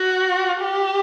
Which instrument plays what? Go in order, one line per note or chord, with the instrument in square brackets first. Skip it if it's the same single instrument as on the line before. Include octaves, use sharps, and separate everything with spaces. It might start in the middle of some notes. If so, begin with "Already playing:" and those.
Already playing: [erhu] F#4
G4